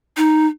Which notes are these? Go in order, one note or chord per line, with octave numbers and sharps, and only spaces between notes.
D#4